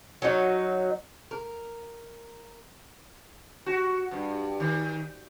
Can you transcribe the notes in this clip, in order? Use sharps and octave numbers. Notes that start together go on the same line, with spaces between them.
F#3 D#4
A#4
F#4
G2
D#3